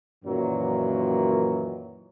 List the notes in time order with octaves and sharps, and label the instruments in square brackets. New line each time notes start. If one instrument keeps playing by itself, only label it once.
[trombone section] F#2 A#2 D#3 E3 F#3